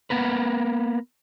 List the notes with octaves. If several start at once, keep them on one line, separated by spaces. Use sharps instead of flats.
A#3 B3 A#4 B4